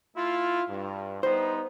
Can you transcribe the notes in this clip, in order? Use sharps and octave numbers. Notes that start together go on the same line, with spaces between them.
A3 E4 F4
G2
G3 B3 D#4 C5